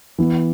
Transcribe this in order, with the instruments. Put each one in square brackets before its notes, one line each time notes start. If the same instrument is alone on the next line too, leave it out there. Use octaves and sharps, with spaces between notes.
[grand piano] E3 B3 E4